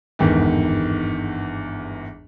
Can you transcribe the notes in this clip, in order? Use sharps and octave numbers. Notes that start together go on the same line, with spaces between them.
G1 E2 G#2 D#3